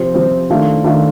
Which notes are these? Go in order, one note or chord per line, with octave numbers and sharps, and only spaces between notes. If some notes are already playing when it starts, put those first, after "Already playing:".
Already playing: C3 F3 C4
C3 F3 C4
D#3 A3 D4 F4
D#3 A3 D4 F4